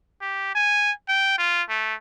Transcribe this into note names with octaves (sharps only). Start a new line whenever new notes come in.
G4
G#5
G5
F4
A3